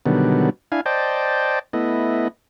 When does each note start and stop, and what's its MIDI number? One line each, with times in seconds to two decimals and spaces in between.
0.06 0.50 47
0.06 0.50 50
0.06 0.50 51
0.06 0.50 54
0.06 0.50 55
0.06 0.50 59
0.72 0.81 62
0.72 0.81 64
0.72 0.81 77
0.72 0.81 80
0.86 1.59 72
0.86 1.59 74
0.86 1.59 75
0.86 1.59 79
0.86 1.59 81
1.73 2.28 57
1.73 2.28 59
1.73 2.28 64
1.73 2.28 75